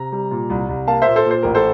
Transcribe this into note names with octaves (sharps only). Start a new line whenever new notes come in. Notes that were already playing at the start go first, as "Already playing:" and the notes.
Already playing: C3 A#5
G3
A#2
C2
C2
A#3 F5 A5
A#2 C5 E5
A4 C5
A#2
C5
A1 A#4
A4 C5